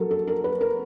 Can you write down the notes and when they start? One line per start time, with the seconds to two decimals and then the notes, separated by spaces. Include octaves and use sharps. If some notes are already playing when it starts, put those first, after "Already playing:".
Already playing: F#3 A4 A#4
0.11 A4
0.27 A#4
0.44 B4
0.61 A#4